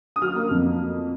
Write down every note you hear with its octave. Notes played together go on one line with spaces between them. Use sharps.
D#6
F#3 F6
A#3
F2